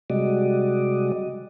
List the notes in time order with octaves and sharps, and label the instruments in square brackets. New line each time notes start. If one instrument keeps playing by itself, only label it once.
[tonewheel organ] C3 G3 G#3 F#4 D5 D#5